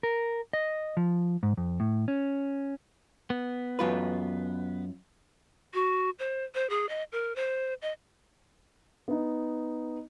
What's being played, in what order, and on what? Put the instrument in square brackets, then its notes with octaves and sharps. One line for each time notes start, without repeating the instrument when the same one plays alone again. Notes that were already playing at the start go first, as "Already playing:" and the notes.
[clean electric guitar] A#4
D#5
F3
G#2
F2
A2
C#4
[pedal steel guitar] B3
[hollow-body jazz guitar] F#2 F4 B4
[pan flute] F#4
C5
C5
G#4
D#5
A#4
C5
D#5
[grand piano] B3 D#4